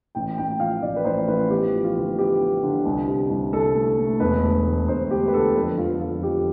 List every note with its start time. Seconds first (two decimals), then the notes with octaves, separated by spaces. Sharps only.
0.15 A1 G5
0.38 A1 G5
0.60 F3 F5
0.82 A1 D5
0.96 B4
1.05 A1 C5
1.28 A1 B4
1.50 B3 G4
1.73 F3
1.84 F4
1.96 D2
2.18 B3 G4
2.41 B3
2.63 D3
2.85 C2
3.07 C3
3.30 C2
3.53 C2 A4
3.75 A3
3.98 A3
4.20 E1 B4
4.43 D2
4.65 D2
4.88 E1 C5
5.11 D2 G4
5.28 B4
5.34 D3 A4
5.55 F2 B4
5.78 F2 F4
6.00 F2 F4
6.23 F2 G4